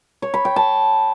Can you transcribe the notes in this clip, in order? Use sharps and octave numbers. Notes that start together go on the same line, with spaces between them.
C#5
B5
G5
A5